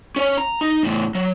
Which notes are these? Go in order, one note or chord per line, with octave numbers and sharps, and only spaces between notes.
C#4 C#5
A#5
D#4
E2 A2
F#3